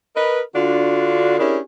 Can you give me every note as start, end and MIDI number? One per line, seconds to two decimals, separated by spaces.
0.15 0.40 70
0.15 0.40 71
0.15 0.40 75
0.54 1.38 50
0.54 1.38 62
0.54 1.38 65
0.54 1.38 66
1.39 1.58 61
1.39 1.58 62
1.39 1.58 64
1.39 1.58 67
1.39 1.58 68
1.39 1.58 70